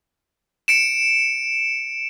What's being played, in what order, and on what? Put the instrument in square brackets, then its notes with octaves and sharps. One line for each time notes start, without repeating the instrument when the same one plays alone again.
[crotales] C#7 D7 E7